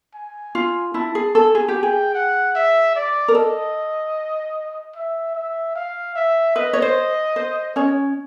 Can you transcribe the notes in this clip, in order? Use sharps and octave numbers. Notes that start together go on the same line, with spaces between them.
G#5
F4
E4 A5
G#4
A4 G#5
G#4
G4
G5
G#4
F#5
E5
D5
A#4
A4 D#5
E5
E5
F5
E5
B4 D#5
C#5
C5
C5
C#4 C#5